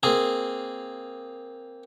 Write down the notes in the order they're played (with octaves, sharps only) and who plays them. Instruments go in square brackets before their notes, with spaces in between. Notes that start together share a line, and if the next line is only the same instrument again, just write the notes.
[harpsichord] A#3 C4 G#4